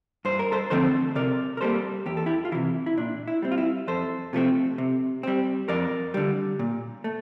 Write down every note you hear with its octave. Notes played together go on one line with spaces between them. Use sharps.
G2 C5
A#4
A4 C5
D3 F3 A3 C4 A4 C5
C3 A#4 D5
A#4
G3 A#3 A4 C5
E2 G4
A4
E4 G4
F4
C3 E3 E4
E4
A#2 D4
E4
G3 C4
F4
E4
F2 A4 C5
C3 F3 A3 C4
C3
G3 C4
F2 A#4 D5
D3 G3
A#2
A3